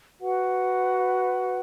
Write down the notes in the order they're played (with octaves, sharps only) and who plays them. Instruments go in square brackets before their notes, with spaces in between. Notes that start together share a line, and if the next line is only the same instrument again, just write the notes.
[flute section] F#4 B4 F#5